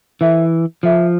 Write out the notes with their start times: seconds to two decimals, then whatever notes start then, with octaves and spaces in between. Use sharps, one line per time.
0.21 E3 A4 C5 E5
0.83 F3 A4 C5 E5